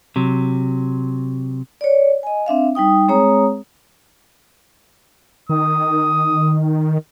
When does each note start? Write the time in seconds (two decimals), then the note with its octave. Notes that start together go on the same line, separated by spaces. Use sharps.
0.16 C3 F#3
1.81 C#5 D5
2.23 D#5 G#5
2.46 C4 D4 E5 F5
2.75 G3 D#4 G5 D#6
3.08 G#3 C4 G#4 C#5 A#5 D#6
5.49 D#3 D#6